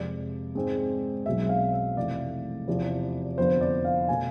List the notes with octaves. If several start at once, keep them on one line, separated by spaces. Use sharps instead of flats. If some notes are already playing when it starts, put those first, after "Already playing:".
Already playing: F2 C3 G#3 D5
G#2 G#3 C4
B1 B2 G#3 C4 E5
F5
E5
F1 F2 C3 E3 A3 D5
E2 C3 F3
F2 D3 F3 B3 C5
D5
F5
B2 A3 G#5